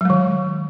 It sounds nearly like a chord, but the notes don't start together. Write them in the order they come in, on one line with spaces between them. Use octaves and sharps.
F#3 G#3 D#3